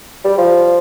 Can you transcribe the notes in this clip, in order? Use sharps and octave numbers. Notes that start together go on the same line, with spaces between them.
G3
F3